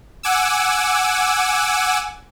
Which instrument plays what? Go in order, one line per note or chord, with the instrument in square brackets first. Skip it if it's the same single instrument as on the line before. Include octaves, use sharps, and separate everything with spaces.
[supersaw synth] F#5 G#5 D6 E6